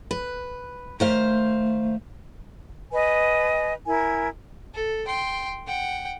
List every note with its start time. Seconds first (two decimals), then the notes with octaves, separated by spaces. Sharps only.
0.11 B4
1.00 D#3 A3 C5 F5
2.92 B4 D#5 G#5
3.86 E4 A#4 G#5
4.74 A4
5.07 G5 C6
5.66 F#5 G5